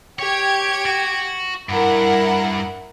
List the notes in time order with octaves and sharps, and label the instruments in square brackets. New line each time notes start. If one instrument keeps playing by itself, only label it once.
[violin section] G4 G#6 D7 [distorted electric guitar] C#5
[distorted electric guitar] F#4
[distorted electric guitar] G2 [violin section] E4 A#4 F#5